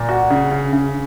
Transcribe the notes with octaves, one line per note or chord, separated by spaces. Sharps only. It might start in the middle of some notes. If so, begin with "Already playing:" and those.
Already playing: A#2
F#4
C#3
C#3
C#3